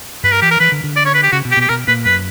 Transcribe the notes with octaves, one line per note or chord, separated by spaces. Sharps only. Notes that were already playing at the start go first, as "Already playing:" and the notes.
G2 B4
A#4
E3 G4
A#4
E3 B4
D3
D3
D5
C#5
B4
G4
C#3 F#4
B2
G4
B2
G4
B2 A#4
A#2 B4
F#2 B4